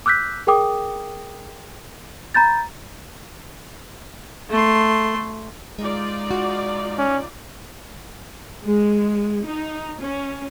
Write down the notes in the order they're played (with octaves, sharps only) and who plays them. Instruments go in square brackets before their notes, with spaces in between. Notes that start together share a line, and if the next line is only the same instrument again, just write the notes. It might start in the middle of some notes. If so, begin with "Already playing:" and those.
[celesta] D6 E6 F#6 G6 B6
G#4 A#4 G5 D6 D#6
A#5 B5 G6 A6
[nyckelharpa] A3 C6
[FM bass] G#3 [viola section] D#4 F4 D5
[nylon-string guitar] F#4
[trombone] C#4
[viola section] G#3
D#4
C#4